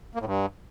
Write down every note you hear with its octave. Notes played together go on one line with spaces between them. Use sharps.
A#3
A2
G2